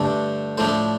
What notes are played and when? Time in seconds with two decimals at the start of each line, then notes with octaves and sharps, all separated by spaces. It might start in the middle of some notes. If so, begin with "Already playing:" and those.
Already playing: G2 D3 A3 D4
0.58 A2 F3 A3 D4 C5